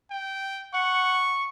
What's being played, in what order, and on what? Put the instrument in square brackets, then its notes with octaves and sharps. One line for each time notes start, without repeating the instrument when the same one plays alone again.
[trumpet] G5
[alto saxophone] F#5 [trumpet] C#6